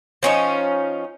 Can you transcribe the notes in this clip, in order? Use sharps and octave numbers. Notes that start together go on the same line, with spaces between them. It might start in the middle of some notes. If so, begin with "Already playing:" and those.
F3 C#4 D#4